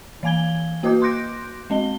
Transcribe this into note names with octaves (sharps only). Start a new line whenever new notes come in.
E3 F5 G#5 G#6 G7
A#3 F#4 B4 D#5 D6 G6
C6 D6 F#6 G6 A#6 D7
G#3 C4 D#5 G7